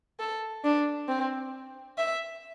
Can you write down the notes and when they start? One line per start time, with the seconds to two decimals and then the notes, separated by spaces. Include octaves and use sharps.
0.20 A4
0.64 D4
1.09 C4
1.98 E5